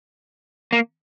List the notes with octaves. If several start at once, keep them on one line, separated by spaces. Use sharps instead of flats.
A#3